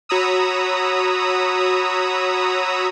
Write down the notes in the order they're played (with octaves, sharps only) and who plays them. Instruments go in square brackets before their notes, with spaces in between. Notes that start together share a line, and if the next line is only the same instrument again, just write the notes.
[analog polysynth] F#4 C#5 A#5 B5 D#6 E6